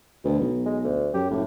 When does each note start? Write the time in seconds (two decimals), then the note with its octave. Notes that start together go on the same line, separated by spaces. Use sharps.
0.25 D2 B2
0.40 B1
0.66 G#3
0.84 D2
1.14 F#2 G4
1.31 F#1 A2